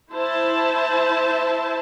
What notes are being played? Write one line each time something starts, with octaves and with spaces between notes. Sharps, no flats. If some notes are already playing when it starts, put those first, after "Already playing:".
E4 C5 A5